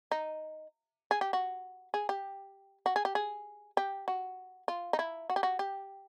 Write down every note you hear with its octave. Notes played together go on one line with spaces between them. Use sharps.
D#4
G#4
G4
F#4
G#4
G4
F#4
G#4
G4
G#4
G4
F#4
F4
D#4
E4
F#4
G4
F#4
G4